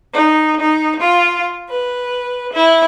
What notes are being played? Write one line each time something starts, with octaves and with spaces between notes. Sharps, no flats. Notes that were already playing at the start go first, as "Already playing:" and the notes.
D#4
D#4
F4
B4
E4